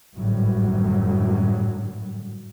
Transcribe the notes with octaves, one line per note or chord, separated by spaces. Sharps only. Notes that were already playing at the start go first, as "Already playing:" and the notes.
G#1 F#2 A2 D3 F#3 G3